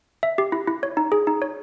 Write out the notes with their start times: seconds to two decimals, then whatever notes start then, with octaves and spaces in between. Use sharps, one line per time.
0.23 E5
0.38 G4
0.52 E4
0.67 E4
0.83 C#5
0.97 D#4
1.12 G#4
1.27 D#4
1.42 C#5